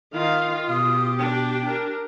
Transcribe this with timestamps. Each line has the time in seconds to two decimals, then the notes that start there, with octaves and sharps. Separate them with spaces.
0.14 D#3 F4 F5
0.69 B2 G4 D#6
1.18 D4 G5
1.65 D4 A#4